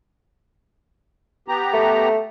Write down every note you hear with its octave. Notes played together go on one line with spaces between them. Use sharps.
B3 G4 A#5
A3